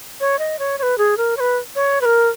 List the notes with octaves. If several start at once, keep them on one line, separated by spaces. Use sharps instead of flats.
C#5
D#5
C#5
C#5
B4
G#4
A#4
C#5
B4
C#5
B4
A#4